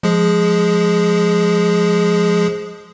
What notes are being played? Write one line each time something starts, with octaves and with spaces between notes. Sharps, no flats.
F3 G#3 G#4